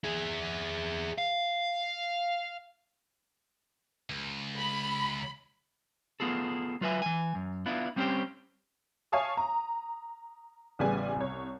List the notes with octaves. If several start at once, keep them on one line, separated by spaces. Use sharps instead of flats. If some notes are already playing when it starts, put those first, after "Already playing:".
E4 G#4
F5
C#2
B5
B3 F4 G#4 A4
F#3 F4 B4 E5 G#5
E3 G#5
F#2
B3 D4 E4 F4
G3 C4 C#4 F4 G4 C5
C#5 F5 G#5 A5 C#6 D#6
A#5
A1 C#3 G3 B3 G#5
C2 C#5